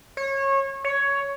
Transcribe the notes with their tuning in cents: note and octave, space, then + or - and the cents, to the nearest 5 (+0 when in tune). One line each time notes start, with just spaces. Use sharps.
C#5 -25
C#5 +10